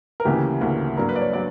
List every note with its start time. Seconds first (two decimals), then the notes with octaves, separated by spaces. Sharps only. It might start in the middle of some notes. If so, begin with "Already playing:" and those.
0.20 A#4
0.25 D2 C#3 E3 A#3 G4
0.61 D2 C#3 E3 A#3
0.97 G2 F#3 A#3 A#4
1.09 B4
1.16 D5
1.21 C#5
1.33 F#3 D5